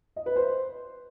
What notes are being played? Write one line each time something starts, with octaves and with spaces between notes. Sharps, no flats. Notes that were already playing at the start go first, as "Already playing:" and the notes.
D#5
B4
C5